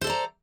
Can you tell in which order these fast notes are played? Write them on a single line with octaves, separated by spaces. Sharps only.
C5 A4 D5 A#5